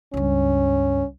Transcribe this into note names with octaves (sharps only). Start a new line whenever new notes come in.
C#2 G2 C#4